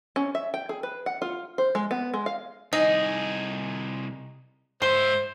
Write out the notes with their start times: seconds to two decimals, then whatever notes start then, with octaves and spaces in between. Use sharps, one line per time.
0.16 C#4
0.35 E5
0.54 G5
0.69 G#4
0.83 B4
1.06 F#5
1.22 F4
1.58 C5
1.75 G#3
1.91 B3
2.14 G#3
2.26 F5
2.73 C2 D#4 G#4 D#5
4.82 G#2 C5 E5 C6